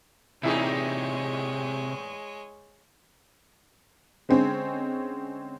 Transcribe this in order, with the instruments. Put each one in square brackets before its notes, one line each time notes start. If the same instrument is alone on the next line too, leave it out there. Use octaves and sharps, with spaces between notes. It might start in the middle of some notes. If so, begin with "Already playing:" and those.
[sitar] E2 A2 D#4 [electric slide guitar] C3 [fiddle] G#3 C#5 [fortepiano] E4 G#4
[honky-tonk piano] D3 G#3 C4 C#4